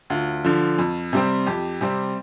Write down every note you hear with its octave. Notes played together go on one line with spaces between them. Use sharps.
D2 F4
D3 F3
F2
C3 G3 C4
F2 G4
C3 G3 C4